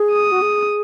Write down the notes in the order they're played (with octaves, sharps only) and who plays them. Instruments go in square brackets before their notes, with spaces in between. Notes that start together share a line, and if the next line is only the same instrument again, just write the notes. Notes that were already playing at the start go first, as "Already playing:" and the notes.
Already playing: [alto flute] G#4
[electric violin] D#6
[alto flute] F#4
G#4